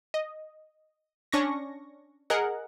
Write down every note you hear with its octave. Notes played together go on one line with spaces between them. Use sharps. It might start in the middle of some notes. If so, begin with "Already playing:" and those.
D#5
C#4 D4 C#6 A#6
G#4 A#4 D#5 F#5